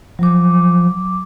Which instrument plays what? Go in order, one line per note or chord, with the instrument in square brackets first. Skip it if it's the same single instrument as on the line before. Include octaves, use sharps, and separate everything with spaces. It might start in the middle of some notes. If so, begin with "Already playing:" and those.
[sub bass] F3 [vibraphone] F#3 D6